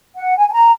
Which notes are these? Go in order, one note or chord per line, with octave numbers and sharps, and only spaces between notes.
F#5
G#5
G#5
A#5